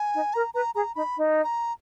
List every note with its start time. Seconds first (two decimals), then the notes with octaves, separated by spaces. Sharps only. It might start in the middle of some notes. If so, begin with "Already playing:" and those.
Already playing: G#5
0.14 D#4
0.34 A#4 A#5
0.54 B4 A#5
0.74 G#4 A#5
0.95 D#4 B5
1.16 D#4
1.44 A#5